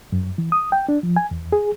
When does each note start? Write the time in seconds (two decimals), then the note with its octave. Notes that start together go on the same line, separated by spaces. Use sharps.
0.12 F#2
0.38 E3
0.52 D#6
0.72 G5
0.89 D4
1.03 F3
1.16 G#5
1.31 E2
1.52 G#4